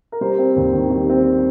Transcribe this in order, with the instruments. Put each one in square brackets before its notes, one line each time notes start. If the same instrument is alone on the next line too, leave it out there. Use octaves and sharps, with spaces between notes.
[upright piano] A#4
G3 C5
C4
D#2
D#3
G3
C4